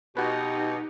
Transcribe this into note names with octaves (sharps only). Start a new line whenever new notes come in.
B2 D#4 F#4 G4 B4